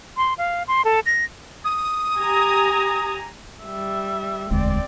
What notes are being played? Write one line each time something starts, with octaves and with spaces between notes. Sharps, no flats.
C6
F5
C6
A4
A#6
D#6
G4 G#5 A#5
G3 E5
E1 D2 G#3 C4 D5